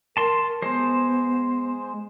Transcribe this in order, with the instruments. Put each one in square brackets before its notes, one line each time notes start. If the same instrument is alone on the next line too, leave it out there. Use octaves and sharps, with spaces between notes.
[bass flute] A#4 [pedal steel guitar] A5 C6
[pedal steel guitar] G#3 C5 [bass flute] B3